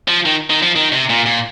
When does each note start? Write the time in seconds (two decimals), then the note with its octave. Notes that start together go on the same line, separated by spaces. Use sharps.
0.08 F3
0.26 D#3
0.50 D#3
0.63 F3
0.76 D#3
0.92 C3
1.10 A#2
1.26 A#2